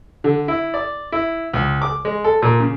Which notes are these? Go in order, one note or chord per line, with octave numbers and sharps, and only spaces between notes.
D3
E4
D5
E4
C#2
D6
G#3
A4
A#2
C#3